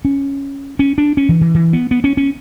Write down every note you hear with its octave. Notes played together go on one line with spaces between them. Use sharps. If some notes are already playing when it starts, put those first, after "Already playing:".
C#4
C#4
D4
C#4
E3
E3
E3
B3
B3
C#4
C#4